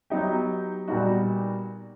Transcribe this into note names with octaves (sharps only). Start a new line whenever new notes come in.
F#3 B3 D#4 G4
A#2 G3 B3 D#4 F#4